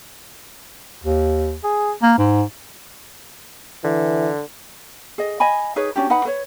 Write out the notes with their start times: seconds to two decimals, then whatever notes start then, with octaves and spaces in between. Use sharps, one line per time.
1.04 D#2
1.64 G#4
2.02 A#3
2.18 G#2
3.84 D3 E3
5.18 G#4 D#5
5.40 D#5 G#5 B5
5.76 D#4 G#4 B4 C#5
5.96 C#4 D4 F#4 G4
6.10 D#4 B4 F#5 B5
6.25 B4 C#5